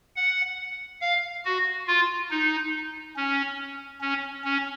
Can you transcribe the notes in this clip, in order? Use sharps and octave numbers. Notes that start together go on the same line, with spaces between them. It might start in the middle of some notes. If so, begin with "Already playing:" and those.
F#5
F5
F#4
F4
D#4
C#4
C#4
C#4